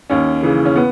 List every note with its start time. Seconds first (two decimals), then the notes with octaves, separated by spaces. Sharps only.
0.10 D#2 C#4
0.43 C#3 E3
0.65 C#4
0.76 B3